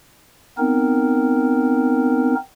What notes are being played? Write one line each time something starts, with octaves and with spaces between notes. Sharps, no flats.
B3 C4 D#4 A#4